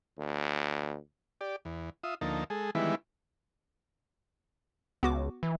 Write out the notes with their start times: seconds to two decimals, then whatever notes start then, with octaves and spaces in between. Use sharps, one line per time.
0.18 D2
1.41 G4 D5
1.65 E2
2.04 F4 E5 D#6
2.21 D2 F3 A#3 D#4 A5
2.50 G#3 G#4 A4
2.75 D#3 E3 G3 G#3 B3 E4
5.03 C#2 B3 F#4 D6
5.43 E3